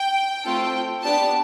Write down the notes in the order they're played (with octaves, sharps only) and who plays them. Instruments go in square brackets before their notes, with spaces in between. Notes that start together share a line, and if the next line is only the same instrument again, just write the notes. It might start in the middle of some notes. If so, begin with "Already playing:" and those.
Already playing: [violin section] G5
A3 C4 F4 A4
B3 D4 G4 A5